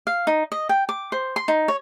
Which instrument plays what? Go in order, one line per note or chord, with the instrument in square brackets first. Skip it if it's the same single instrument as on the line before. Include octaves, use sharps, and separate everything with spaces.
[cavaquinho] F5
D#4
D#5
G5
D6
C5
C6
D#4
C#5